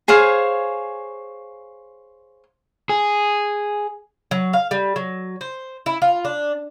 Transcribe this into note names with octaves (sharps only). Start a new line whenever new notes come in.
G#4 C5 C#5 F5
G#4
F#3
F5
G3
F#3
C5
E4
F4
D4